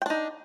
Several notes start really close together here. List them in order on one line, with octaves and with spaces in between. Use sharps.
G5 D4 D#4